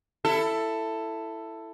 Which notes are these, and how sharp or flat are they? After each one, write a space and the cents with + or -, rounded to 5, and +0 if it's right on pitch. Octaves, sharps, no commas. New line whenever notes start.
E4 +10 A4 +10